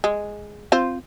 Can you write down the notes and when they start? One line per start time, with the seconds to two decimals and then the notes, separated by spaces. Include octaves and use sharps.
0.04 G#3
0.72 C4 F4 C5